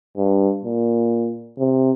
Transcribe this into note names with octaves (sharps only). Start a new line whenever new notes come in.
G2
A#2
C3